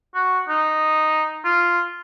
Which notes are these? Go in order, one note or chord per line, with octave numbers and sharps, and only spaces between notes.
F#4
D#4
F4